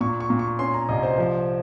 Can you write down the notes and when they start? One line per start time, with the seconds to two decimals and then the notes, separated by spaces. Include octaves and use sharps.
0.01 A#2 C#6
0.20 C#6
0.30 A#2
0.39 C#6
0.59 C#4 C6
0.74 A#5
0.89 C2 D#5
1.03 C5
1.18 F3